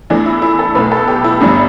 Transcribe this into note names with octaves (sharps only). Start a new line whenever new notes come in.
E2 E3 A3 D4
E4
E4
A4
B1 B2 A3 B4
A4
G4
E4
G1 G2 E3 G3